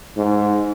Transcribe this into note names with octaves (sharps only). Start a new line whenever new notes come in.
G#2